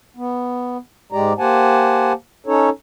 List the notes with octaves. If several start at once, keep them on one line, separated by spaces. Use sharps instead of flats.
B3
G#2 G#3 G4 D5 A#5
A#3 G4 C5 F#5 G#5 A5
C#4 D#4 A4 C#5